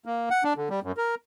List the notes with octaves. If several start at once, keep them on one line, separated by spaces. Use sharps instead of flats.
A#3
F#5
D4
D3
G3
F#2
A#4